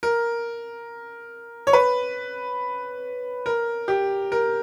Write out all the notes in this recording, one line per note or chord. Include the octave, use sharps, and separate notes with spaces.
A#4
C#5
B4
A#4
G4
A#4